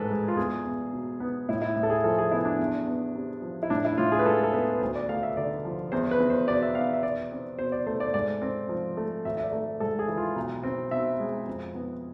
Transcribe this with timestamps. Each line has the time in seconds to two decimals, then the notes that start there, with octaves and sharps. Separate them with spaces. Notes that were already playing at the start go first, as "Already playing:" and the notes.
Already playing: A1 G#2 A4 B4
0.10 G#3
0.28 F4
0.37 E2 G#4
0.65 E2
0.93 B2
1.20 B3
1.49 A2 E4
1.62 E4
1.76 A2
1.83 A4
1.90 G#4
2.04 F3 A4
2.18 G#4
2.32 B3 E4
2.45 D4
2.59 E2
2.87 B3
3.15 C3
3.42 F3
3.63 E4
3.70 A2 D4
3.85 E4
3.97 A2 F4
4.12 G#4
4.19 B4
4.26 G#3 A4
4.43 A4
4.53 B3 B4
4.73 B4
4.81 D2 C5
4.96 D5
5.09 A3 F5
5.23 E5
5.37 D3 D5
5.65 F3
5.92 E2 C5
6.11 B4
6.20 E2
6.30 C5
6.48 B2 D5
6.62 E5
6.75 B3 F5
6.93 E5
7.03 E2 D5
7.31 C4
7.59 B2 C5
7.72 D5
7.87 A3 C5
8.00 D5
8.14 G#2 D5
8.42 C4
8.69 F3
8.97 A3
9.25 G#1 E5
9.37 E5
9.44 D5
9.53 A3
9.80 G#2 A4
9.99 G#4
10.08 E3
10.17 F4
10.36 B1
10.63 C4
10.91 B2 E5
11.20 G#3
11.47 F2
11.74 B3